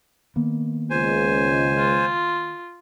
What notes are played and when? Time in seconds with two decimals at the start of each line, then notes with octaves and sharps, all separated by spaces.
0.36 D#3 A#3 B3
0.90 C#2 C5 G#5
1.77 F4